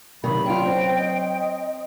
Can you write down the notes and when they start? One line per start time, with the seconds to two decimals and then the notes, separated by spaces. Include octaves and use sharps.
0.24 C3 D#3 F#3 B5
0.46 D4 E4 F4 G5
0.65 C4 C5
0.98 D#5